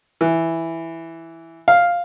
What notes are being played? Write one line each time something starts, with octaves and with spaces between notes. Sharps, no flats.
E3
F5